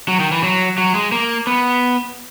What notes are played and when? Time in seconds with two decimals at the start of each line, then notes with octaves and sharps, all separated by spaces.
0.08 F#3
0.20 D#3
0.32 E3
0.43 F#3
0.78 F#3
0.95 G#3
1.12 A#3
1.47 B3